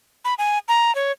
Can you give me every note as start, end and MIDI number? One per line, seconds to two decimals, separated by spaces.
0.25 0.34 83
0.38 0.58 80
0.68 0.94 82
0.95 1.12 73